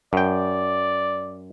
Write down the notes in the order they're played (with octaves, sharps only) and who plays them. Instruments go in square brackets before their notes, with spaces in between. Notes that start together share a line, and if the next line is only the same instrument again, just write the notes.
[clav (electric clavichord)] F#2 G5 [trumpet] D5